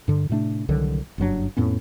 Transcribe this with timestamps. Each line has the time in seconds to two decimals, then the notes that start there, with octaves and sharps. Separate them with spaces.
0.08 G2 D3
0.29 A2 C3 A3 D4
0.69 C2 D3 D#3 F#3
1.18 F#1 G2 F#3 D4
1.57 F2 A2 B3 C#4